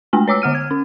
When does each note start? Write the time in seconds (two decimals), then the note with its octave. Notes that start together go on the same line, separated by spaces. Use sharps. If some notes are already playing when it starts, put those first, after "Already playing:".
0.13 G#3 A3 D4 G#5
0.28 B4 C#5 D6 E6
0.42 D3 F#5 F6 D#7
0.55 G#6
0.71 C#4